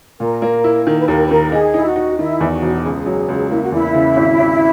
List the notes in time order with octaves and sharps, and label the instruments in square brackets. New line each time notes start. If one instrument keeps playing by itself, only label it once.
[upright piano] A#2 [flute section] A#4
[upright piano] A#3
E4
[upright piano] D#3 [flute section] A#4
[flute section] B4
[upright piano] D#2 [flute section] A#4
[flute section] B4
[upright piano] D#3 [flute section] A#4
[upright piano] D#4 [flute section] G#4
[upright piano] D#4 [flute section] E4
[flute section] F#4
[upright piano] D#4
[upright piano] D#3 [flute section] E4
[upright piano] E2
[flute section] F#4
[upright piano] E1
[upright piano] C#2 [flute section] G#4
[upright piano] F#3
C#2
[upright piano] A#3 [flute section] E4
[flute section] F#4
[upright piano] E2 [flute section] E4
[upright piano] C#3
G#1
G#1